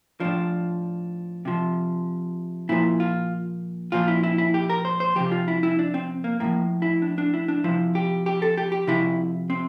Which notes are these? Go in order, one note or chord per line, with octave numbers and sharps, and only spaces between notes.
A2 F3 D4
C3 F3
A#2 F3 E4
F4
A#2 F3 F4
E4
E4
E4
G4
A#4
C5
C5
C3 F3 G4
F4
E4
E4
D4
C4
A#3
A2 F3 A#3
E4
D4
D4
E4
D4
C3 F3 E4
G4
G4
A4
G4
G4
C3 F3 E4
C4